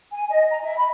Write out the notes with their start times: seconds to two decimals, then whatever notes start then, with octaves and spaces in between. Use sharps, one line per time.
0.12 G#5
0.30 D#5
0.50 A#5
0.63 E5
0.77 B5